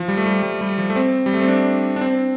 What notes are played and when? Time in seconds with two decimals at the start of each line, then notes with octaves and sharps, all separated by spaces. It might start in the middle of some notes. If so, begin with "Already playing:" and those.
Already playing: F3
0.08 G3
0.17 A3
0.26 G3
0.42 G3
0.61 G3
0.78 F3
0.90 A3
0.96 C4
1.26 G3
1.33 A3
1.41 C4
1.48 D4
1.96 D4
2.01 C4